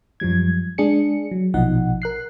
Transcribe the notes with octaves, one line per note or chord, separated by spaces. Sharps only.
F#2 F3 G3 G#6
G#3 D4 G#4 C#7
F#3
A#1 B2 F3 D#4 F#5
A#4 F#6 C7